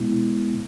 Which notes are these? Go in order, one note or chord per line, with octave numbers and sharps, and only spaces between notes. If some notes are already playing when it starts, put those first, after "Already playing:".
Already playing: B2 G#3 B3 E4